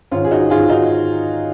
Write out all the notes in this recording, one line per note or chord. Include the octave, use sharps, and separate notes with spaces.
G#2 D#3 C#4 F4
G#4
D#4 F#4
G#2 D#3 F4 G#4
D#4 F#4